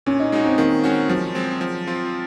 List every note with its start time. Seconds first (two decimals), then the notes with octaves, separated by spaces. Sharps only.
0.06 A#2 C#4
0.20 D#4
0.32 G#3 D#4 F#4
0.45 C4
0.58 D#3 A#3
0.84 G#3 C#4 F#4
1.09 F3 F#3
1.35 G#3 C4
1.61 F3
1.87 C4 F4